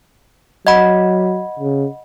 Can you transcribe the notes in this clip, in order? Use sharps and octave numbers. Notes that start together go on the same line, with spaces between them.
F#3 D#5 F#5 B5
C#3